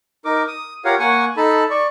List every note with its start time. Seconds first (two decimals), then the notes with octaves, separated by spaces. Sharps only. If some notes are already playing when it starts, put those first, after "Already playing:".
0.25 D#4 A#4 D6
0.48 D#6
0.85 F4 G4 A#4 C#5 F5 F#5
0.99 A#3 F#5 G#5 C#6
1.37 D#4 A4 A5 B5
1.70 D5 C#6